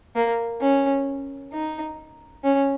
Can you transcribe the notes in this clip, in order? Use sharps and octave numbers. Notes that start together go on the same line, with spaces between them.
A#3
C#4
D#4
C#4